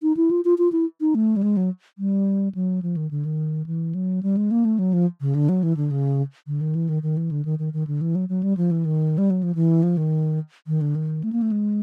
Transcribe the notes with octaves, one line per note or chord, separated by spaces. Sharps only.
D#4
E4
F4
F4
F4
E4
D#4
A3
G3
G#3
F#3
G3
F#3
F3
D#3
D3
D#3
E3
F#3
G3
G#3
A#3
A3
F#3
F3
C#3
D3
F#3
E3
D3
C#3
D3
D#3
E3
D#3
D#3
E3
D3
D#3
D#3
D#3
D3
E3
F#3
F#3
G3
F3
E3
D#3
G3
F#3
F3
E3
F3
D#3
D#3
D3
D#3
A3
A#3
A3
G#3